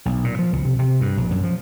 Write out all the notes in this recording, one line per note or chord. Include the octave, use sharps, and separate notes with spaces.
B1
A#2
F3
C#2
C3
C3
G2
A#1
F#2
F3